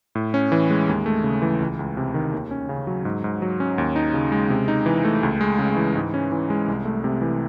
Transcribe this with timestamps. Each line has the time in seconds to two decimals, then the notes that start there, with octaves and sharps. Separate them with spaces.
0.15 A2
0.34 C#4
0.52 E3
0.70 G#3
0.88 D#2
1.06 A3
1.24 C#3
1.42 E3
1.60 C#2
1.79 C#2
1.97 C3
2.14 D#3
2.32 D#2
2.51 C#4
2.69 C#3
2.87 F#3
3.05 G#2
3.24 G#2
3.42 F#3
3.60 C#4
3.78 D#2
3.96 D#4
4.14 C#3
4.32 G#3
4.50 C3
4.68 D#4
4.86 E3
5.04 A3
5.23 C#2
5.41 G#3
5.59 C#3
5.76 E3
5.96 G#2
6.14 C#4
6.32 E3
6.50 G#3
6.68 C2
6.85 A3
7.04 C3
7.22 E3